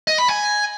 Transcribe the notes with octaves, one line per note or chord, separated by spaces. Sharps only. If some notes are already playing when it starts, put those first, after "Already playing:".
D#5
B5
G#5